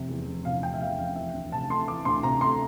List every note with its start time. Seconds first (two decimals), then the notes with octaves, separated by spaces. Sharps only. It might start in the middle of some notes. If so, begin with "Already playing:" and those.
Already playing: F1 C3
0.09 E2
0.27 F1
0.45 C3 F5
0.63 F1 G5
0.74 E5
0.81 E2 F5
0.99 F1 F5
1.16 E3 E5
1.34 D2
1.52 C3 A5
1.70 A3 C6
1.87 E3 D6
2.05 D2 C6
2.23 C3 A#5
2.41 A3 C6